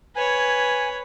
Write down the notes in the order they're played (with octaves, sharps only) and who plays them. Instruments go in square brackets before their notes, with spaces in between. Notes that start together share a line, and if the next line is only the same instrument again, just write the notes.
[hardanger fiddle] B4 C#5 [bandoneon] G#5